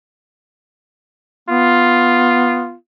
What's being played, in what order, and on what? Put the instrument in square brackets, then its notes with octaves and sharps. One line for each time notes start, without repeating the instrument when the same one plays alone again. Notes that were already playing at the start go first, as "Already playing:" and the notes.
[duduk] B3 [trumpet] F4